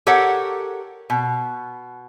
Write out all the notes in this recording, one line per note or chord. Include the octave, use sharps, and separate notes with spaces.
G4 A4 A#4 C#5 F#5
B2